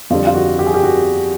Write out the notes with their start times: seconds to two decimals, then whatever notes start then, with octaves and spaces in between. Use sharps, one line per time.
0.10 F2 D3 G3 F4
0.27 F4
0.35 F#4
0.59 G4
0.67 G#4
0.74 G4
0.83 F#4